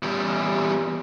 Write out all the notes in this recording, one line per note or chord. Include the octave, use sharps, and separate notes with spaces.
E2 G3